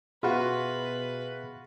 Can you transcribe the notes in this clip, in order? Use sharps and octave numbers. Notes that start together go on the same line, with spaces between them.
B2 F4 F#4 G#4 B4 E5 B5